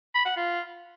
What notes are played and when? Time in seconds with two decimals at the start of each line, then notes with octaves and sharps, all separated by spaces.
0.15 B5
0.26 F#5
0.37 F4